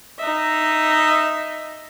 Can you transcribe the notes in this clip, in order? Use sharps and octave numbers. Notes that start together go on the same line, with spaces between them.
D#4 D#5 E5